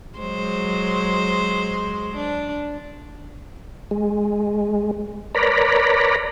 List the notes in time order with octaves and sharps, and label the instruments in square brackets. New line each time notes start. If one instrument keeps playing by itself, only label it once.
[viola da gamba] F#3 G#3 C5
D4
[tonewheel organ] G#3
A#4 B4 C#5 D5 A#5 B5